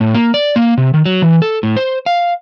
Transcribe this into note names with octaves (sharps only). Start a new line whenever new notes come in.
A2
A#3
D5
A#3
C3
D#3
F#3
E3
A4
A2
C5
F5